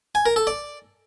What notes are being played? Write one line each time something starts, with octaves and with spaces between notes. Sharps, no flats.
G#5
A#4
A4
D5